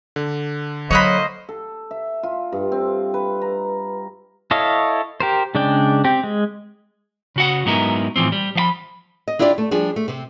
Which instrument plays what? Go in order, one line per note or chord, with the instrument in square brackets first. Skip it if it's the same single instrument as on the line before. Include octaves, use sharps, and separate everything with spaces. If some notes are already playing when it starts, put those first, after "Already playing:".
[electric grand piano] D3
[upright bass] F#3 [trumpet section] A#3 C5 D#5 [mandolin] C#5 F#5 B5
[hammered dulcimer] A4
E5
F4
G2
C4
B4
A#5
[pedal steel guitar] E4 A4 C#5 D#5 F5
G4 A#4 C5
C#3 G#3 D4 D5 G5
C4 G4
G#3
[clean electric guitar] C#3 F#4 F#5
G#2 F#3 B3 D#4 E4 A#4
A2 E3 F3 C4
G3
F3 F5 B5
[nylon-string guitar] D#5
D4 E4 F4 G4 D5
A3
F3 G3 D4 G#4
A3
C3 C4